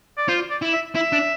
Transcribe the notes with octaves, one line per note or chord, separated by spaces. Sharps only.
D5
F4 C5
D5
E4
E5
E4 E5
D4